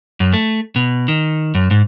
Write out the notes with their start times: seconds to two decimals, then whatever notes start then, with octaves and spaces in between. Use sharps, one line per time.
0.20 F#2
0.33 A3
0.76 B2
1.08 D#3
1.55 F#2
1.71 G#2